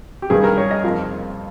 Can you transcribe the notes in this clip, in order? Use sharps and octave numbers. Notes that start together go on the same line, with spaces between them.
G4
G2 D#3 G3 G#4
A#4
C#5
D#5
F2 D#3 A#3 F4